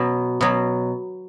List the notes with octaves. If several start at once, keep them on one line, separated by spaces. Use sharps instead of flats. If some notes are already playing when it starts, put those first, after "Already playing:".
Already playing: B2 F#3 B3
B2 F#3